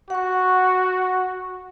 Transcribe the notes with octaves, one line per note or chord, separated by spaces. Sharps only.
F#4 F#5 C#6